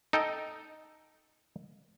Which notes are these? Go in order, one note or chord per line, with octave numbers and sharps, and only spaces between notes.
D#4 A4 G5